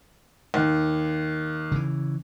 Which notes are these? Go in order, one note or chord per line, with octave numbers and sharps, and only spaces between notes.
D#2
C#3 E3